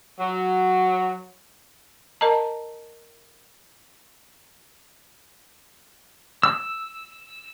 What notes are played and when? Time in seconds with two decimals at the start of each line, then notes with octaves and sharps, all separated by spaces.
0.19 F#3
2.21 A#4 D#5 A5 A#5
6.43 E6